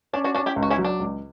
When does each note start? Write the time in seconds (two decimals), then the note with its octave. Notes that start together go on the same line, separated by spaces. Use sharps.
0.13 C#4 D4
0.24 D4 F#4
0.35 C#4 D4 F#4
0.46 E4 G4
0.56 C#2
0.63 F#4
0.70 C#4 E4
0.78 F#3
0.85 D4
1.00 C#2